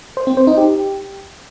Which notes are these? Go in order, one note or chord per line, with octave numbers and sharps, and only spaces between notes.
C5
C4
C5
D#4
G4